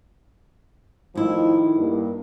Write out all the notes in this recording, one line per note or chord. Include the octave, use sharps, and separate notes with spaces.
A2 D#3 F3 D#4 E4
G2 A#3